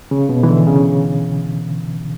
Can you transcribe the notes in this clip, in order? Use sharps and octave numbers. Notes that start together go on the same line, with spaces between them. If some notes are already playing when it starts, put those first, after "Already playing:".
C#3
B2
E3
D3
C#3